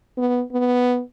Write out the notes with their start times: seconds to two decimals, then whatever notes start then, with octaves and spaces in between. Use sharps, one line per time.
0.18 B3
0.52 B3